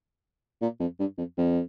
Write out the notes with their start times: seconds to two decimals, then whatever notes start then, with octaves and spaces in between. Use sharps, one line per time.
0.62 A#2
0.80 F2
1.00 G2
1.18 F2
1.38 F2